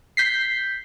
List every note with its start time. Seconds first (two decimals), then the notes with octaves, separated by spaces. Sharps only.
0.17 G6 B6 C7